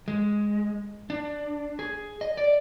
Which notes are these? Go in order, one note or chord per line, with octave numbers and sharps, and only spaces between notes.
G#3
D4
G#4
D#5
D5